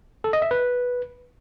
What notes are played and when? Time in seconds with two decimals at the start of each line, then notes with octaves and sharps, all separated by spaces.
0.24 A4
0.33 D#5
0.42 E5
0.51 B4